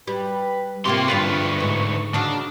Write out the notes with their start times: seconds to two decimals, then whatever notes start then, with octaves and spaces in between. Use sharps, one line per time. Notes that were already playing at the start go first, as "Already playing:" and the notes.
0.07 G3 B4
0.85 C3 A#3 F4 G4 C6 C#6
1.08 D2 G2 F4 B4 C5
1.60 G#2
2.14 C#3 D4 D#4 F#4